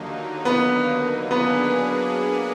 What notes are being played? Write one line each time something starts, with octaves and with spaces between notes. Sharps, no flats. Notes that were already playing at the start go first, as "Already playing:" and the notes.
Already playing: D#2 D3 F#3 A#3 D#4
B3
F#3 A#3 B3 D4 G#4 B4